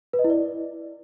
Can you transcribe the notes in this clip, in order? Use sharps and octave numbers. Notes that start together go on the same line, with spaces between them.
B4
D#5
E4
D5